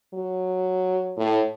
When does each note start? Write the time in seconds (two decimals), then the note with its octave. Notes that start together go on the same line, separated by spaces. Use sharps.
0.14 F#3
1.17 A2